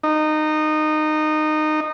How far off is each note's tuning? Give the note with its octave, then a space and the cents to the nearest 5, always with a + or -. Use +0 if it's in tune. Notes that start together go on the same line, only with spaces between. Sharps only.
D#4 -20